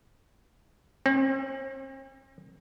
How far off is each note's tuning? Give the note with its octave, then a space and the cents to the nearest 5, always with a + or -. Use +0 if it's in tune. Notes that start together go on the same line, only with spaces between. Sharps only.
C4 +45